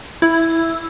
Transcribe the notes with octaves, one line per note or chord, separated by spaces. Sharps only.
E4